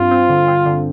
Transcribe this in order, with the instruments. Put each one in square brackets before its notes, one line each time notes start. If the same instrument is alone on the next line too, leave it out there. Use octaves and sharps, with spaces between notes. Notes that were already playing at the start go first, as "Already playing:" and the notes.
Already playing: [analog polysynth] G2 C4 [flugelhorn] F4
[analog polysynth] C4
D3
C4
D3